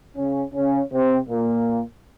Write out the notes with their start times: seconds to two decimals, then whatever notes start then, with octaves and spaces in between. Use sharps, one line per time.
0.17 C#3 C#4
0.54 C#3 C#4
0.91 C3 C4
1.28 A#2 A#3